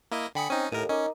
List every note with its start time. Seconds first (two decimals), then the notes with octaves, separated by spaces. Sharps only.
0.11 A#3 E4 D#5
0.35 D3 G5 G#5 B5 D#6 C#7
0.50 C4 C#4 D#4 D#7
0.72 D#2 A2 A4 A#4 D#7
0.89 C#4 D#4 A#4 D6